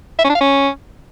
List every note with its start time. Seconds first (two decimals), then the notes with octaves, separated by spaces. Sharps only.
0.19 E5
0.24 C#4
0.30 D4
0.35 F5
0.41 C#4